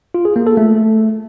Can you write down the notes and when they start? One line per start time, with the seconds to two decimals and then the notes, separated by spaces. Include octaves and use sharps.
0.14 F4
0.25 G#4
0.36 A#3
0.47 A4
0.57 A3